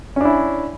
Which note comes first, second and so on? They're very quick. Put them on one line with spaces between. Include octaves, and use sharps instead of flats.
C#4 D4 E4